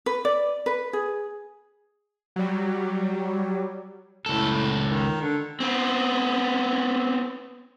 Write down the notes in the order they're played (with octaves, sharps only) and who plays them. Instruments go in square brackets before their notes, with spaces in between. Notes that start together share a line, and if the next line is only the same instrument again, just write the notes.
[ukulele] B4
D5
B4
G#4
[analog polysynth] F#3 G3
[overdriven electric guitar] C#2 A4 [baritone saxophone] A2
[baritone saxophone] D#3
D3
[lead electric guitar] B3 C4